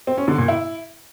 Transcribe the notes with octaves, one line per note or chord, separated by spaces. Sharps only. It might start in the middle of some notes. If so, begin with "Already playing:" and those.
C4
C#4
D3
A#2
E4